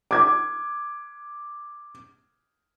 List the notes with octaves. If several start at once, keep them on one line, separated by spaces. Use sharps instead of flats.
D6 G#6